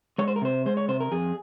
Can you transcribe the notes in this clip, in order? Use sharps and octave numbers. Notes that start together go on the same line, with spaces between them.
G#3 C#5
C5
A#4
C3 C5
G#3 C5
C#5
C3 C5
A#4
F2 G#4